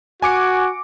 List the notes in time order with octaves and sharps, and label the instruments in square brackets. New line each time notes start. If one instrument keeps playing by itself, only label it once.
[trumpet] F#4 [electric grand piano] G#5 D6 C#7